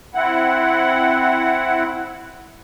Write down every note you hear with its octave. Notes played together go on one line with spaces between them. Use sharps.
C4 E4 F#5